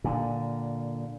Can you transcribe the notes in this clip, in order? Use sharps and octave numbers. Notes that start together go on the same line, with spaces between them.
A#2 D3